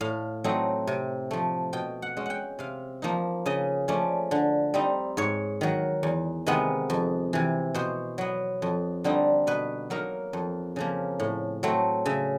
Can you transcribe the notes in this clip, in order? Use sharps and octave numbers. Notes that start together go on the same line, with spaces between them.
A2 F5
F#3 A3 C4 D#4
C3
F3 A3
B2 G5
F#5
G#3 C#4
F#5 G5
C3 F5
F3 A#3 D#4
C#3 D#5
F3 A3 C#4 D5
D3
G3 C4 D#4
G#2 C#5
D#3 F#3
E2
C3 D#3 G#3 B3
F2
C3 E3
B2 C5
F#3 B3
F2
D3 G3 C4 D#4
B2 B4
F#3 A#3 D#4 A#4
F2
C#3 F3 A#3
A2
F#3 A3 C4
C#3 E5